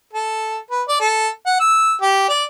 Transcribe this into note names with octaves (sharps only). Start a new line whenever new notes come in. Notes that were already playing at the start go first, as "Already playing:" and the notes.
A4
B4
D5
A4
F#5
E6
G4
D5